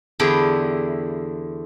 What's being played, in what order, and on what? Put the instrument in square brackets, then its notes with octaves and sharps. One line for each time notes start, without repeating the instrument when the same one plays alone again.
[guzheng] E2 D3 E4 G4